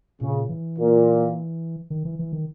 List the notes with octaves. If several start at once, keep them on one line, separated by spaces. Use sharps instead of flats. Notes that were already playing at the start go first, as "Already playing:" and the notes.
A#2 C#3
E3
A#2
D#3
E3
E3
D#3